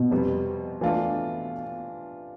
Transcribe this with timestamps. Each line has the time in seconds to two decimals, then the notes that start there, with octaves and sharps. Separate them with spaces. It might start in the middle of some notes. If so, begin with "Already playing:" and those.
Already playing: B2
0.11 F2 C3 G3 B3
0.81 E3 A3 D4 F4